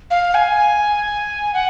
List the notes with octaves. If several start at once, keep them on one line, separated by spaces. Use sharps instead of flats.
F5
G#5
F#5